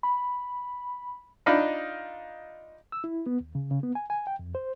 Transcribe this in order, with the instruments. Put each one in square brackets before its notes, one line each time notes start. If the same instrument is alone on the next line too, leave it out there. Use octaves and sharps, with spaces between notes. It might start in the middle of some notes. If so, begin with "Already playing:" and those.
[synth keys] B5
[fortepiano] D4 D#4 F4 D#5 F5 B5
[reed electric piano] E6
E4
B3
D#2
C#3
C#3
B3
G#5
G#5
G5
F2
C5